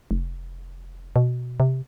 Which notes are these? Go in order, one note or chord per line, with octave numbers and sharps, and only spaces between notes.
F1
B2
C3